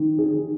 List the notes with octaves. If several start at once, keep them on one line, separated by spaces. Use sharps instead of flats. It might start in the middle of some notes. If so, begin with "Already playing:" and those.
Already playing: D#3
G#4
D#3